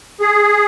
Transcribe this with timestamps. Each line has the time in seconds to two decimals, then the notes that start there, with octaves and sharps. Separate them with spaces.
0.21 G#4